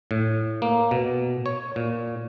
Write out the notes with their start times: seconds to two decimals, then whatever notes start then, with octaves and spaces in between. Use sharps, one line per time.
0.11 A2
0.62 A#3
0.91 B2
1.46 C#5
1.76 A#2